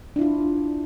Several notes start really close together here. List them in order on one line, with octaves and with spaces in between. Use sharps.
D4 E4 F4